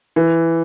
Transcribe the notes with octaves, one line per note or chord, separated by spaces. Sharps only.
E3